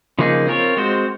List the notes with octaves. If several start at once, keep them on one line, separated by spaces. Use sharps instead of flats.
C#3 F3 A#3 D#4 G#4
C4 F4 A#4 C#5
G#3 C4 F#4 C5